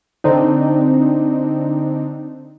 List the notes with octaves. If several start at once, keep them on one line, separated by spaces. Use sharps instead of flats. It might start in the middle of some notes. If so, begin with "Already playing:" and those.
D3 C4 D4 D#4